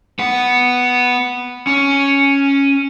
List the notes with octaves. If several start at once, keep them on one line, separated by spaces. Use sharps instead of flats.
B3 F#5
C#4